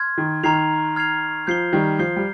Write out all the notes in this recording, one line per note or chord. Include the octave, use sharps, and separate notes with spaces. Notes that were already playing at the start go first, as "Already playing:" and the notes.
Already playing: C6 F6 G#6
D#3
D#3 A#5 F6 G#6 C7 F7
A#5 F6 G#6 C7 F7
F3 G6 C7 G7
D#3 G3
F3 G6 C7 G7
G3